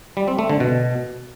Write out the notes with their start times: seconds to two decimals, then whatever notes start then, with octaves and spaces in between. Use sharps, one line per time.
0.17 G3
0.28 C4
0.39 A3
0.49 D3
0.60 B2